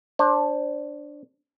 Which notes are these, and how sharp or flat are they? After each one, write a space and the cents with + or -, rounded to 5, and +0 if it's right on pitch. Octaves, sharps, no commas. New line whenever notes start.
D4 +0 C5 +25